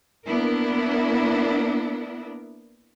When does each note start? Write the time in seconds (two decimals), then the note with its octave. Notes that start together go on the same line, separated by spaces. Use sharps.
0.26 A#3 B3 D4 E4 A#4